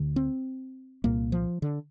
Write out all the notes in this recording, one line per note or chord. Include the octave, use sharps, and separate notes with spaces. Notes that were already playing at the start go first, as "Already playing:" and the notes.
Already playing: D2 D3
C4
C2 A#2 A#3
F3
D3